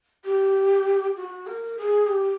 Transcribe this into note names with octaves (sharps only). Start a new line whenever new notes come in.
G4
F#4
A#4
G#4
G4